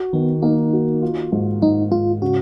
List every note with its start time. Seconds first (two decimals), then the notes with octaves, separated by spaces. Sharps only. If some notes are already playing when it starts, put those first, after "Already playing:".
Already playing: F#4
0.13 D#3 B3
0.42 A#3 D#4
0.73 F#4
1.02 F4
1.32 G#2
1.62 G#2 D#4
1.91 G#2 F4
2.22 C#3 F#4